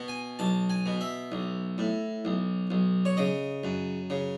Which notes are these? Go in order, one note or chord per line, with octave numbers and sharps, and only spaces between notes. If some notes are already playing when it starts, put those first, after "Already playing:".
Already playing: B2
G#5
B1 A5
G#5
B2
E5
B1
A2
B1
B1
C#5
C#3 D#5
F#2
C#3